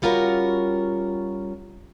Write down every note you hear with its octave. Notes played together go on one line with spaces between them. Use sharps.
G3 C#4 F4 F#4 A#4